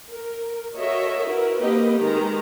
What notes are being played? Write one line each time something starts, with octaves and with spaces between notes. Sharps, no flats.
A#4
F#4 A4 A#4 C#5 D#5 E5
E4 F#4 A#4 B4
A#3 C4 D#4 G4 B4 D#5
D#3 G#3 A#5